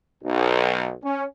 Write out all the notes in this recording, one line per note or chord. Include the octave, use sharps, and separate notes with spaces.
B1
C#4